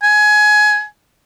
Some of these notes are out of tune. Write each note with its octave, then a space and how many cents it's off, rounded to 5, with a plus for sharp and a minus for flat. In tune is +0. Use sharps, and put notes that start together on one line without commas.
G#5 +20